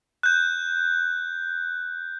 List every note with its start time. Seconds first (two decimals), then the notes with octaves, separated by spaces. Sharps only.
0.23 F#6 G6